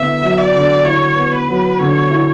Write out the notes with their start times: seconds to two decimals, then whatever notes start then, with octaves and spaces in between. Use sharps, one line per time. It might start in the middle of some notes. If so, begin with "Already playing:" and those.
Already playing: D3 B3 E4 E5
0.22 F#3
0.38 D5
0.53 D3
0.85 E4 C#5
1.16 B3
1.32 B4
1.48 F#3
1.79 D3 C#5
2.10 E4